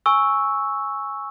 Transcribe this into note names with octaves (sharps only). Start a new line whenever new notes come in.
G#5 C#6 E6